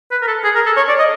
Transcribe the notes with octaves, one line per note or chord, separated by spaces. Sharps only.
B4
A#4
A4
G#4
A#4
A4
C#5
D5
D#5